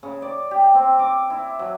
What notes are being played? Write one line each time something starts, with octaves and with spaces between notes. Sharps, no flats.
C#3
D5
G4
C4
D6
E4
F#3